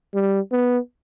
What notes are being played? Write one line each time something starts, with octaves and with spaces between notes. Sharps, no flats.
G3
B3